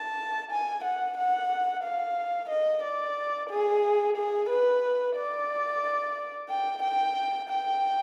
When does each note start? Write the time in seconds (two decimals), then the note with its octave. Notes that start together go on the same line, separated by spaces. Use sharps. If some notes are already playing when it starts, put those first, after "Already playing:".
Already playing: A5
0.51 G#5
0.84 F#5
1.17 F#5
1.84 F5
2.50 D#5
2.83 D5
3.50 G#4
4.17 G#4
4.50 B4
5.16 D5
6.49 G5
6.83 G5
7.49 G5